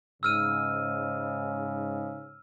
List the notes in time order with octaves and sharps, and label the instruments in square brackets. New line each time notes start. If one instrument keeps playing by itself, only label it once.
[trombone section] G#2 C#3 [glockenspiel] E6 F6 D#7